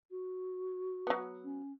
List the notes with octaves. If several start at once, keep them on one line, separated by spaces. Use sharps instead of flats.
F#4
F#3 B3
C#4